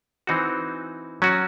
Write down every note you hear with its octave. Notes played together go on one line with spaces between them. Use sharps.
E3 C4 D#4 F#4
F#3 C#4 F#4